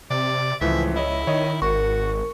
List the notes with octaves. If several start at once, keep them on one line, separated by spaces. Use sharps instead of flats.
C3 D5
C#2 A2 E3 F3 E5
E4 C#5 D#5 E5
D#3 C#5 D#5
G#1 F#4 A#4 C#6